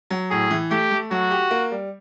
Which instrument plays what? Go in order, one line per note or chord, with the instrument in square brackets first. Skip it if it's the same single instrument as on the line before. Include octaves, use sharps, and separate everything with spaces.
[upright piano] F#3
[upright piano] A2 [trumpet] G#4
[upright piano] E3
[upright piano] A3 [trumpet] G4
[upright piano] A3
[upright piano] F#3 [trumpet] F#4
[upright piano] G4
A#3
G3